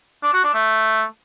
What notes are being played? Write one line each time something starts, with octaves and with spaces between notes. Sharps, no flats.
D4
F#4
D4
A3